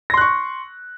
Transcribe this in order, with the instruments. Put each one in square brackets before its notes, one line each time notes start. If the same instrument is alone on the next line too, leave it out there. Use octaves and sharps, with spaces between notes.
[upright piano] A#6
C6
F#6
C#6